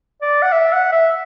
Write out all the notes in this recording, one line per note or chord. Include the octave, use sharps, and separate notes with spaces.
D5
F#5
E5
F#5
E5